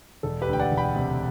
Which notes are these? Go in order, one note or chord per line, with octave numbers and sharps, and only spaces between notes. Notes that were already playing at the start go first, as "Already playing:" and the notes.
E1 A4
G4 B4
D2
G5
D5 F#5
E1
G5 B5
C3